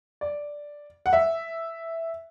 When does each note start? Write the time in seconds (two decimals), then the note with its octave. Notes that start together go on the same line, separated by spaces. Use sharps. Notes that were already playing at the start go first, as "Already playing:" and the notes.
0.21 D5
1.06 F#5
1.13 E5